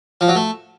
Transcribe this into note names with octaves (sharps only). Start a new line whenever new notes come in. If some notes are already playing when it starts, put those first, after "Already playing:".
F3
F#3
A3